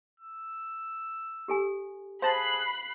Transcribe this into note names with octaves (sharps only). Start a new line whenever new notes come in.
E6
G4 A4 G#5
G#4 C5 F5 A5 B5 F#6 C7